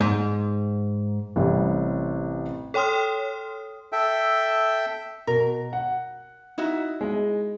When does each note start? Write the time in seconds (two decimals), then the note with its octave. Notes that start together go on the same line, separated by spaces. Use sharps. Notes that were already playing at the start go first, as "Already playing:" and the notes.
0.01 G#2
1.36 A1 C3 G3
2.74 A4 C#5 G5 C6 D#6 F6
3.92 A4 E5 G5
5.27 B2 A#4
5.73 F#5
6.58 D#4 E4 F#4
7.01 G#3 D#5